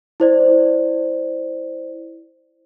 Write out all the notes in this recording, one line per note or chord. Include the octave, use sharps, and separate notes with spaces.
E4 C5 D5